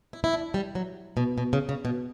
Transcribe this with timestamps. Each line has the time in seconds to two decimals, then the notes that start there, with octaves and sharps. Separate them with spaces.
0.13 E4
0.24 E4
0.33 D4
0.54 G3
0.75 F#3
1.17 B2
1.38 B2
1.53 C#3
1.69 C#3
1.85 B2